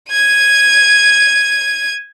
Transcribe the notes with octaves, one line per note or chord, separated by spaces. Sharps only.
G#6 D#7